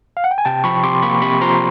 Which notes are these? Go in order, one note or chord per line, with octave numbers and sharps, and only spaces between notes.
F5
F#5
G5
G#5
C3 G5 A5
F3 B5 C#6
C3 C6 D6
A#3 B5 C#6
C3 B5 C#6
F3 A#5 C6